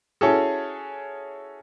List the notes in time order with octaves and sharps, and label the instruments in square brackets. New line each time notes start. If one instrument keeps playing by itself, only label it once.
[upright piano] C#4 E4 F#4 G#4 A4